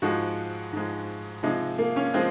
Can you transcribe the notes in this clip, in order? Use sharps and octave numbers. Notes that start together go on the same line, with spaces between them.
G#2 F3 G#3 F#4
G#2 F3 G#3
C3 F3 G#3 D#4
A#3
C#4
F3 G#3 C4